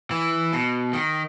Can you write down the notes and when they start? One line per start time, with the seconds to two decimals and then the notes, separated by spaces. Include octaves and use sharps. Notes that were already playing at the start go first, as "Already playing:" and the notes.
0.11 E3
0.53 B2
0.93 D#3